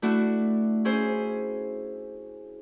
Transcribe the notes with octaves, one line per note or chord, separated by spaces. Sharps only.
A3 D4 E4 F#4
C#4 E4 G#4 C5